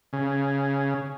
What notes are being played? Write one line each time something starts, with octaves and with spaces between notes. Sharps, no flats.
C#3